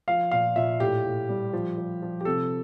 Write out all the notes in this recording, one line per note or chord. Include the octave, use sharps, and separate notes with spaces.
F3 F5
A#2 F5
A#2 E5
A2 G4
A2
G3
F3
F3
F3
G4
C3 A4